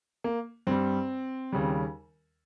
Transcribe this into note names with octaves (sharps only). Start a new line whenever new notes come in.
A#3
G2 G3 C4
D#2 C#3 G3